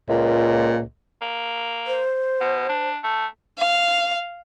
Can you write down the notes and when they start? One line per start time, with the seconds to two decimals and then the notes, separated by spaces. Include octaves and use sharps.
0.09 C#2 A#2
1.22 A#3
1.87 C5
2.41 B2
2.69 D4
3.03 A3
3.58 F5